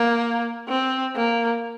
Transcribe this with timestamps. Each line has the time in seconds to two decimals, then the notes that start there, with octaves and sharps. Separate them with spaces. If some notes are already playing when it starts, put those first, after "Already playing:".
Already playing: A#3
0.69 C4
1.15 A#3